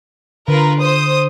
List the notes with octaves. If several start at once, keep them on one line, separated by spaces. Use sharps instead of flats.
D3 F4 A#4 B4
C5 D#6